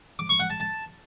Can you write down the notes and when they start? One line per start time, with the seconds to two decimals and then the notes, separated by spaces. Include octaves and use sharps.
0.19 D6
0.29 C#6
0.40 F#5
0.50 A5
0.60 A5